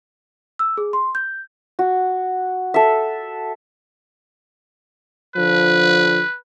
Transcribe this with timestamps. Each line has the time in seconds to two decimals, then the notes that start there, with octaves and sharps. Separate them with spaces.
0.59 E6
0.77 G#4
0.93 C6
1.15 G6
1.79 F#4
2.74 A4 E5
5.36 D3 F3 B4